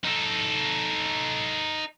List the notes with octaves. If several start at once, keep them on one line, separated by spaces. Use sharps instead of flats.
D#4 A4